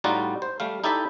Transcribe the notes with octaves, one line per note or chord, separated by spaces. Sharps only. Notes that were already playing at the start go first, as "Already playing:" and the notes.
A2 G3 D#4 F4 F#4 D5
C5
G3 A3 F5
D#4 E4 G4 A4 D5 E5